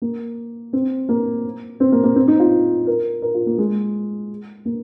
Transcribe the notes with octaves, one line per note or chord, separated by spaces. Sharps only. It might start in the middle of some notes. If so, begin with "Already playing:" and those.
A#3
C4
A#3
C4
A#3
A#3
C4
D#4
F4
A#4
A#4
F4
A#3
G#3
A#3